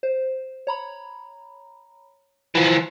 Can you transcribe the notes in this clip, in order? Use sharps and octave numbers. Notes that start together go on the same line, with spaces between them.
C5
C#5 A#5 B5
E3 F3